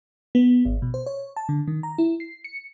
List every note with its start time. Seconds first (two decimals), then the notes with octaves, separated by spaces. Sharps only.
0.35 B3
0.65 G#1
0.82 B2
0.94 C5
1.06 C#5
1.37 A5
1.49 D3
1.68 D#3
1.83 A#5
1.98 E4
2.20 C7
2.44 C#7